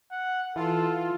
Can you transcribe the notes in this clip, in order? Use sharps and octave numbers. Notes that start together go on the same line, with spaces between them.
F#5
E3 F4 A4